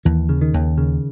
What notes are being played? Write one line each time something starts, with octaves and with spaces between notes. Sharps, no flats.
D#2 E3
C#3
D#3
D#2
C#3